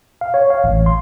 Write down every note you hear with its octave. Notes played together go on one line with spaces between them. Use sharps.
F5
C#5
F5
A1
C6